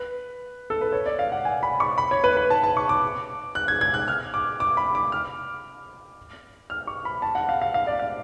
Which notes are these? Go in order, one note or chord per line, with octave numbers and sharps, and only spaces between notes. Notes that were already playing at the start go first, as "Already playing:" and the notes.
Already playing: B4
A4
B4
C#5
D5
F5
F#5
G#5
B5
C#6
B5
C#5
B4
B4
A5
A5
C#6
D6
F#6
G#6
G#6
F#6
F6
D6
D6
B5
D6
F6
F6
C#6
B5
A5
F#5
F5
F5
F5
D5
F5